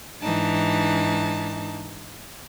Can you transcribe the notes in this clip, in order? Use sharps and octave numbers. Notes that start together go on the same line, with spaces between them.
G#2 E3 D4 D#4 A5